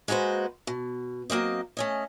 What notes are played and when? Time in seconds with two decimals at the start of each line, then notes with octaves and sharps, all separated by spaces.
0.08 G#3 A#3 F#4 B4 C5
0.67 B2
1.30 F#3 A#3 C4 D#5
1.77 A3 C#4 D#5